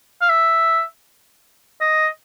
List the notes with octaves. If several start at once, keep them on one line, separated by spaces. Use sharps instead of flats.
F5
E5
D#5